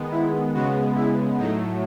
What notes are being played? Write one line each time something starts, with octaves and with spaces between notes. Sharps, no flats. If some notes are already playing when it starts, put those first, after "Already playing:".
Already playing: D#3 G#3 B3
E4
C#3 G#3 B3 F#4
E4
A2 F#3 A3 D#4